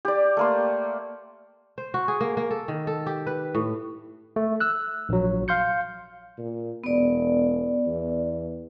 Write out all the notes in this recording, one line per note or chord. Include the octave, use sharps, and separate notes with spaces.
G4 D5
A3 A#3 C6
C5
F#4
G#4
A#3
A#3
A4
D#3
A4
G4
B4
A2
A3
E6 F#6
A#1 F#3
F5 C6 G6 C#7
A#2
E1 B3 D5
E2